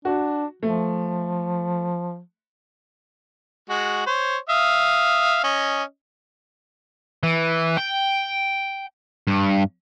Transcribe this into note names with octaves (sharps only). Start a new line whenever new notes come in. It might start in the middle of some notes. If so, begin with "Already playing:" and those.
D4 F#4
F3 A3
G#3 F#4
C5 C#5
E5 F5 D#6
C#4 D#5
E3
G5
G2